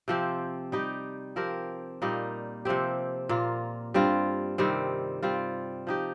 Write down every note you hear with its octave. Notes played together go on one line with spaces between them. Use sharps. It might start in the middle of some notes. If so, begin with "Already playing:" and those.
C3 F3 C4 G4
G3 D#4 G4
F3 C4 G4 A#4
A#2 G3 A#3 D#4
C3 F3 C4 G4
A#2 A#3 F4
G2 G3 C4 F4
C3 D#3 G3 C4
G3 C4 F4
F3 D#4 G4